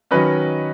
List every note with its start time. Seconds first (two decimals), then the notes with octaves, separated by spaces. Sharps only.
0.11 D#3 F#3 C#4 B4 D#5